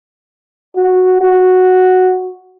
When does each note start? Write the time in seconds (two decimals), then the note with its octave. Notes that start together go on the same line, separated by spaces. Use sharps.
0.76 F#4
1.21 F#4